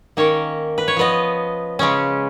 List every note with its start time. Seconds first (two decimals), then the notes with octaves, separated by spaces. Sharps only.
0.17 D#3 A#3 C#4 A#4 C#5
0.78 B4
0.88 C#5
0.97 F3 B3 B4 D#5
1.79 C#3 G#3 C#4